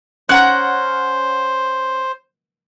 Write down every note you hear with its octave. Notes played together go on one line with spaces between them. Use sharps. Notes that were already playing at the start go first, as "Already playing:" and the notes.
C#4 C5 F#5 A#5 F#6